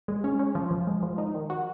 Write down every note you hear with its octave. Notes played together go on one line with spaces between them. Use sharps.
G#3
C#4
C#4
F3
F3
G#3
F3
D#4
D#3
F#4